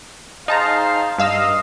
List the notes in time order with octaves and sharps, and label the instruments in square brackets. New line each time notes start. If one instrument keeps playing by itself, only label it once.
[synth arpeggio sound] D#4 A5 A#5 [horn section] G#4 C5 F5
[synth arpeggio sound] G2 F5 E6 [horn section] D#5